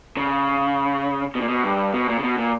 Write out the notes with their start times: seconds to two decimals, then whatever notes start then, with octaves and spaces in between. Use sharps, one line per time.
0.17 C#3
1.35 B2
1.41 A#2
1.48 B2
1.64 G2
1.94 B2
2.09 A#2
2.19 C#3
2.24 B2
2.38 A#2